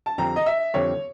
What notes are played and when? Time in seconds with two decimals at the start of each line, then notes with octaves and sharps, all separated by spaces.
0.06 A5
0.18 F2 D3 G3 C4 A#5
0.36 D#5
0.46 E5
0.74 F2 D3 G3 C4 C#5